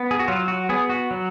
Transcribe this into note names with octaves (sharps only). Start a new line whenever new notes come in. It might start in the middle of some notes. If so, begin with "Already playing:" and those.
Already playing: B3
G#4
F#4
F#3 F4
F#4
B3 G#4
F#4
F#3